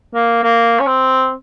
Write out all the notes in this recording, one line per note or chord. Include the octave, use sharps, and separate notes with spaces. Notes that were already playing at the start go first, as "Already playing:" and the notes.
A#3
A#3
C#4
C4